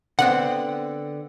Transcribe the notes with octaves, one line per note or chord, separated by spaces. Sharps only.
D3 B3 C4 F#5